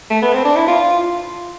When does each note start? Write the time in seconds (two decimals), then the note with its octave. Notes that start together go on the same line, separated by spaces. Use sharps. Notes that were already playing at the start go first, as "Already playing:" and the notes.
0.10 A3
0.22 B3
0.33 C4
0.45 D4
0.56 E4
0.68 F4